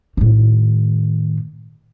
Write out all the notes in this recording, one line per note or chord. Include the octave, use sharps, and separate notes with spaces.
A2 D#3